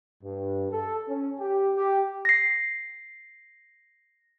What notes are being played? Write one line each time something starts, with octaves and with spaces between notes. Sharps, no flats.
G2
A4
C#4
G4
G4
A#6 C7